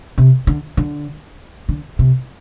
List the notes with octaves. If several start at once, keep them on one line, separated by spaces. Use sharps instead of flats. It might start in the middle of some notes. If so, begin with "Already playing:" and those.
C3
D3
D3
D3
C3